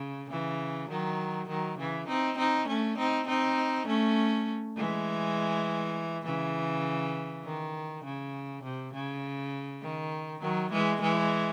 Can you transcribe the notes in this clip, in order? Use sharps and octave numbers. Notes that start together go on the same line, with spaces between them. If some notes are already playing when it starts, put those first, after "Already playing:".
Already playing: C#3
C#3 E3
D#3 F#3
D#3 F#3
C#3 E3
C4 D#4
C4 D#4
A3 C#4
C4 D#4
C4 D#4
A3 C#4
E3 G#3
C#3 E3
D#3
C#3
C3
C#3
D#3
D#3 F#3
E3 G#3
E3 G#3